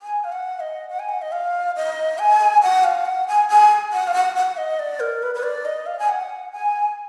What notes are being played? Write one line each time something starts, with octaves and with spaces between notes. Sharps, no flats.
G#5
F5
F#5
D#5
F#5
G#5
F#5
D#5
F5
D#5
G#5
F#5
F5
F#5
G#5
G#5
F#5
F5
F#5
F#5
D#5
D5
A#4
B4
B4
D5
D#5
F5
G#5
F#5
G#5